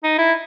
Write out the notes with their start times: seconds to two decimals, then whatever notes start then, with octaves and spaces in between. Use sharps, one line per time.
0.04 D#4
0.18 E4